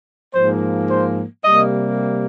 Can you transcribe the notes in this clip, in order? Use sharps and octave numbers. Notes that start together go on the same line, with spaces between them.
G#2 F3 A#3 C5
C5
C3 G3 A#3 D#5